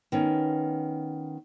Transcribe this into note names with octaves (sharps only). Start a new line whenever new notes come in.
D#3 B3 C#4